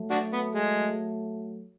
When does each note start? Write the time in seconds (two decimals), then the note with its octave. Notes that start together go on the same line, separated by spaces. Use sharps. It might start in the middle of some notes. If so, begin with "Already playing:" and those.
Already playing: F#3 A3
0.10 D4 F#4
0.33 B3
0.54 G#3